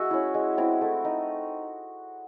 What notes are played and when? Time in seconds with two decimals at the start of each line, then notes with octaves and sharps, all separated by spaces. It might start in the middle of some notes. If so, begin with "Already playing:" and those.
Already playing: G#3 F#4 E5 G#5
0.11 C#4 E4
0.34 G#3
0.58 C4 E4
0.81 A3
1.05 D#4